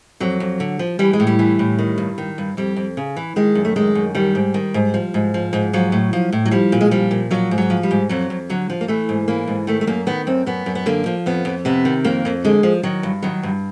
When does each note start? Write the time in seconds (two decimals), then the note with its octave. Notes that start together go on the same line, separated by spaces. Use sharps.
0.20 F2 F#3
0.40 F2
0.60 D3
0.79 F3
0.99 E3 G3
1.13 G#3
1.20 A2
1.27 G3
1.39 E3
1.59 A2
1.79 D#3
1.98 G2
2.18 D#3
2.38 G2
2.57 F2 G3
2.76 F2
2.97 C#3
3.16 E3
3.36 D#3 G#3
3.55 F#2
3.65 A3
3.76 D#3 G#3
3.95 F#2
4.15 D#3 G3
4.35 G#2
4.54 D#3
4.74 G#2
4.94 F3
5.14 G#2
5.34 F3
5.53 G#2
5.73 F3 F#3
5.92 A2
6.13 F3
6.32 A2
6.46 F#3
6.51 F3 G3
6.72 A#2
6.81 G#3
6.91 F3 G3
7.11 A#2
7.30 F3 F#3
7.51 G#2
7.58 F#3
7.70 F3
7.83 G3
7.91 G#2
8.09 F2 F#3
8.30 F2
8.49 D3 F#3
8.70 F3
8.81 A#3
8.88 E3 A3
9.09 G#2
9.28 E3 A#3
9.47 G#2
9.67 D#3 A3
9.81 A3
9.87 F#2 A#3
10.07 D#3 B3
10.27 F#2 C4
10.46 F#2 B3
10.66 F#2
10.75 B3
10.86 D3 A#3
11.06 F3
11.26 F2 B3
11.45 F2
11.65 C3 B3
11.85 D#3
12.04 F2 A#3
12.25 F2
12.44 D3 G#3
12.63 F3
12.83 D#3 F#3
13.03 G2
13.22 D#3 F#3
13.43 G2